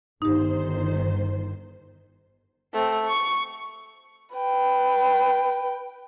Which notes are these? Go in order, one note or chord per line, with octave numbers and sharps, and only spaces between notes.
G1 D#3 D#4 G4 C5
A3 C4
C#6
B4 G5